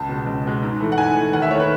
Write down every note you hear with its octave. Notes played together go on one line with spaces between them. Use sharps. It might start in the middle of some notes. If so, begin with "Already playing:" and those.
Already playing: C#2 A5
B2 G#3
C#2
B2 G#3
G#2
E3 A3
F#5
G#2 G#5
E3 A3
D#2 F#5
E5
D#3 A3 C#5
B4